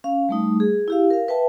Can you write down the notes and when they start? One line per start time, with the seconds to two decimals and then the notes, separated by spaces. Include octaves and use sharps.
0.04 C#4 F5
0.29 G3 A3 D#4
0.60 G#4
0.88 E4 G4 F5
1.10 A#4 F5
1.28 B4 E5 G5 A5